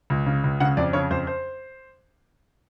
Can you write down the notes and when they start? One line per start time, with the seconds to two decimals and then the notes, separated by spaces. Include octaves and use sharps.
0.10 C#2
0.26 C#3
0.44 C#2
0.60 C#3 F#5
0.77 F2 D5
0.93 C#3 C#5
1.10 F2 C5
1.27 C5